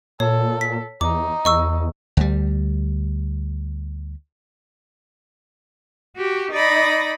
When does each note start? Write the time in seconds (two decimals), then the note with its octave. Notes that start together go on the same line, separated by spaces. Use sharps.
0.20 A#2 A4 C#5
0.61 B6
1.01 E2 D#4 D6
1.45 E2 D#5 C#6 E6
2.17 D2 G3
6.16 F#4 G4
6.52 D#4 D5 B5 A#6